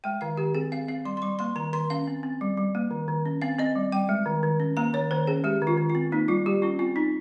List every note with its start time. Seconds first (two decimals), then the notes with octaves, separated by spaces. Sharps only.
0.04 G#3 G5
0.21 D#3 F5
0.37 D#3 G4
0.55 C4 G#4
0.72 C4 F5
0.88 C4 F5
1.05 G3 C6
1.17 C6
1.22 G3 C#6
1.39 A#3 C6
1.56 D#3 A#5
1.73 D#3 C6
1.90 C#4 F5
2.07 C4
2.23 C4
2.41 G3
2.57 G3
2.75 A#3
2.91 D#3
3.08 D#3
3.26 C#4
3.42 C4 F5
3.59 C4 D#5
3.75 G3
3.92 G3 G5
4.09 G#3
4.26 D#3
4.43 D#3
4.60 C#4
4.77 A#3 A#5
4.93 D#3 C#5
5.11 D#3 C5
5.27 C#4 G#4
5.44 G#3 G4
5.62 D#3
5.67 F4
5.77 D#3
5.90 F4
5.95 C4
6.12 A#3 D#4
6.28 G3 F4
6.46 G3 G4
6.62 C#4 F4
6.79 C4 F4
6.96 C4 D#4